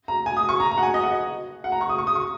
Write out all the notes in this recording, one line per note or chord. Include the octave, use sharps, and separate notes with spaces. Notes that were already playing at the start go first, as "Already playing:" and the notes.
A#5
G#5
D#6
C#6
A#5
A#5
F#5
G#5
D#5
F#5
D#5
F#5
A#5
C#6
D#6
C#6
D#6
C#6